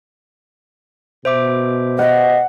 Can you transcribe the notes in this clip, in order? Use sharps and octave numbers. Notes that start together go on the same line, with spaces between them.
B2 C5 E5 D6
D#5 F#5